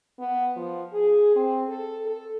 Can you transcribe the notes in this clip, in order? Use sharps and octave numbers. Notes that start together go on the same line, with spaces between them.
B3
F3
G#4
C4
A4
A4